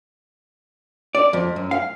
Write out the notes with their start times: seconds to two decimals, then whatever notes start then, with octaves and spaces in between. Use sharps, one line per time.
1.15 D5
1.33 F2
1.56 F#2
1.71 F5